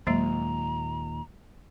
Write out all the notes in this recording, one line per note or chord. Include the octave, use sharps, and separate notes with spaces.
D#2 A#2 F#3 G#3 A#3 A#5